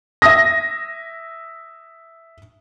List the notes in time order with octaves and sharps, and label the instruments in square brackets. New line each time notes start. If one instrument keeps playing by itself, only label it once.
[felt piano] E5 D#6 [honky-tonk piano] A#6